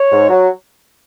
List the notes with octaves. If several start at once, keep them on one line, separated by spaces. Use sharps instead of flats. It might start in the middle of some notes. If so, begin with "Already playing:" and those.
Already playing: C#5
G#2
F#3